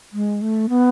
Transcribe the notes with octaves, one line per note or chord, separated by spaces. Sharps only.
G#3
A3
B3